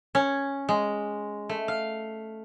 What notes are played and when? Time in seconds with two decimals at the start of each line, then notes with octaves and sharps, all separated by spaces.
0.15 C#4
0.69 G#3
1.49 A3
1.68 F5